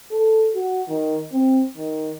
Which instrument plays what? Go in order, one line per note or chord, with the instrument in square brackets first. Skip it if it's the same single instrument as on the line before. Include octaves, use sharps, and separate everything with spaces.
[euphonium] A4
F#4
D#3
C4
D#3